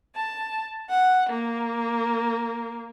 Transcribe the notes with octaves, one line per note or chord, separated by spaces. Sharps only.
A5
F#5
A#3